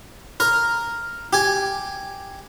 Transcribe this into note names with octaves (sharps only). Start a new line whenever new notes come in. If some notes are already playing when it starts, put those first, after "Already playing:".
A#4 A#5
G4 G#5